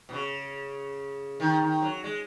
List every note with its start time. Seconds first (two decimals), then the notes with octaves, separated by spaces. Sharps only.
0.09 B2
0.13 C#3
1.40 D#3
1.62 D#3
1.82 F#3
2.04 G#3